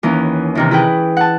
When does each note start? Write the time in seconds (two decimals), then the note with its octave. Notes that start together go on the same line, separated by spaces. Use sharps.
0.03 D#2 E3 C#4
0.55 C3 D#3 E3
0.71 E4 G#4 B4 G5
1.17 F#5 A5